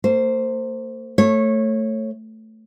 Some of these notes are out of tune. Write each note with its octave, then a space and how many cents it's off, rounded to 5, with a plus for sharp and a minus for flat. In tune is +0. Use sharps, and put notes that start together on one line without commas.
A#3 -45 C5 +0
A3 +10 C#5 -20